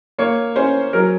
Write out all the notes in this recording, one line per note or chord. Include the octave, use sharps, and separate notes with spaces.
A#3 C#5
C#4 C5
F#3 A#4